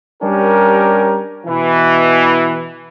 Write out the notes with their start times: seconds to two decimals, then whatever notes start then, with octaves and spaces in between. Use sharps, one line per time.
0.23 G3 C#4 D4 G4 A#4
1.47 B2 E3